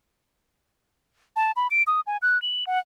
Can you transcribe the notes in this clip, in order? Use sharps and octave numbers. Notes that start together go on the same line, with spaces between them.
A5
B5
D7
D#6
G#5
F#6
F#7
F#5